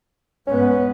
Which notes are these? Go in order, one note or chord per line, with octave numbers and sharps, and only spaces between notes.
G#2 B3 C#4